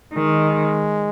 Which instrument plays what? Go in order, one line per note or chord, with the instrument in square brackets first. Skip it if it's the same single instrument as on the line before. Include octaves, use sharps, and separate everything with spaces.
[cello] D#3 [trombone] G#3